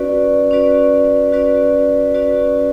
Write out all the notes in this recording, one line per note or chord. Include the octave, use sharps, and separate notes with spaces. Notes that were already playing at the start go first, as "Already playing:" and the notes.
Already playing: C#4 F#4 B4 D5
C#4 F#4 B4 D5
C#4 F#4 B4 D5
C#4 F#4 B4 D5